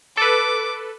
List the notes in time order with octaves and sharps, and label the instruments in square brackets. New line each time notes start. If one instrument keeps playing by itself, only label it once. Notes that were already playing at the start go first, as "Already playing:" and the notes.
[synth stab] A4 B4 [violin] D6